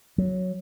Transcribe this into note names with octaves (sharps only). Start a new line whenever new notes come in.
F#3